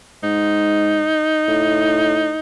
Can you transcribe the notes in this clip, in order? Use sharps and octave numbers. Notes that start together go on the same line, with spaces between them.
G#2 D#4
A2